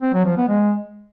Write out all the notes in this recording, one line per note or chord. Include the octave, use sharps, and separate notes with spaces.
C4
F#3
F3
B3
G#3